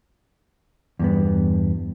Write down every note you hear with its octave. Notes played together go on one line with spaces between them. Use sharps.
E2 G2 B3